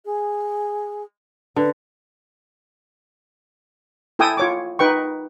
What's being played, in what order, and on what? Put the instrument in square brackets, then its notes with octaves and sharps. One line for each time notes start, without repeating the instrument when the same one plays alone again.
[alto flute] G#4
[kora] D3 [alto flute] B4
[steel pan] E4 A4 G5 G#5 D#6 E6
F4 C#5 D6
D#4 B4 G5 C#6